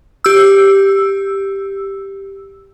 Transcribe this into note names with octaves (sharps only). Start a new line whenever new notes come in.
G4 E6